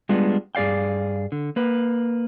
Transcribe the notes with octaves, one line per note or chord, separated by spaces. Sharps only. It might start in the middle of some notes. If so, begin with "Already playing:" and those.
G3 G#3 B3 D4 F4
G2 G#4 D5 F5 G5
D3
A#3 B4